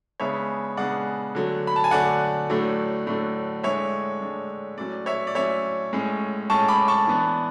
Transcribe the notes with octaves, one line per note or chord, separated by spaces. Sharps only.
C#3 G#3 B3 D4 C#5 E5
C#3 G#3 B3 D4 D5 F#5
D3 F#3 A3
B5
A5
G#5
D3 F#3 A3 D5 F#5
A2 F#3 A3 D4
A2 F#3 A3 D4
A2 G#3 D4 C#5 E5
A2 G#3 D4
A2 F#3 C#4 D5
C#5 E5
D5
A2 F#3 C#4 C#5 E5
A2 G#3 C#4
A2 G#3 C#4 A5 C#6
B5 D6
A5 C#6
E3 B3 D4